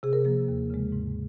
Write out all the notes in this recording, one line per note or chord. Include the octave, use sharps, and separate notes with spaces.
C3 G#4
A#4
F3 A#3 G#4
D#2
C#3 G#3
G#2